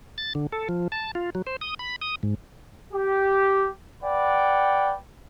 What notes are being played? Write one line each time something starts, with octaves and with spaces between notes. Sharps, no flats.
A6
D3
A4
F3
A5
F4
F#3
C5
D#6
B5
D#6
G#2
G4
B4 D5 F#5 G5